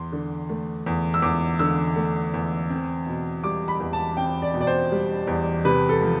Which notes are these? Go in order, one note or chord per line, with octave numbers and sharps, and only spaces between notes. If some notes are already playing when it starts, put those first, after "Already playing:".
Already playing: E2 C6
D3
A3
E2
E6
E2 D6
D3 E6
A3
E2
C4
B2
G3 D6
B5
E2
A5
C4 G5
D5
B2
D5
C5
G3
E2
C3 B4
A4
F3